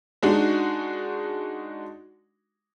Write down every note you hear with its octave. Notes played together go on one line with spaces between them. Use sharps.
G#3 D4 D#4 F#4